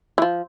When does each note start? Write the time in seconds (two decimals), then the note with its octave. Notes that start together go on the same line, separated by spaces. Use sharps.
0.18 E3
0.22 F3